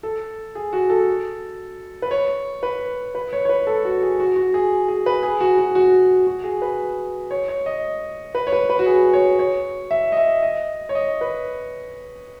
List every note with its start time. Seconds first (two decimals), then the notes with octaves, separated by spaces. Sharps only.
0.03 A4
0.55 G#4
0.73 F#4
0.90 A4
2.02 B4
2.11 C#5
2.63 B4
3.15 B4
3.33 C#5
3.45 C#5
3.49 B4
3.67 A4
3.85 F#4
4.02 G#4
4.20 F#4
4.36 F#4
4.54 G#4
4.88 G#4
5.06 B4
5.23 G#4
5.41 F#4
5.58 F#4
5.75 F#4
6.27 F#4
6.44 G#4
6.62 B4
7.31 C#5
7.48 C#5
7.66 D#5
8.35 B4
8.47 C#5
8.53 B4
8.70 B4
8.79 F#4
8.86 G#4
9.13 C#5
9.39 C#5
9.91 E5
10.12 D#5
10.17 E5
10.43 D#5
10.89 C#5
10.95 D#5
11.21 B4